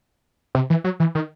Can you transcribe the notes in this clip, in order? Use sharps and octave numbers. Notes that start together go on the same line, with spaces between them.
C3
E3
F#3
E3
D#3